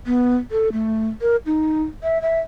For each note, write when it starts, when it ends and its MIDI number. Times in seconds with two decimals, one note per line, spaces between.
0.06 0.36 59
0.51 0.72 69
0.72 1.09 57
1.21 1.36 70
1.46 1.83 63
2.03 2.21 76
2.22 2.39 76